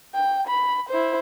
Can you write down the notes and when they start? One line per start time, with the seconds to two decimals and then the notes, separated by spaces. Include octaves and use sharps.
0.14 G5
0.48 B5
0.90 E4 C5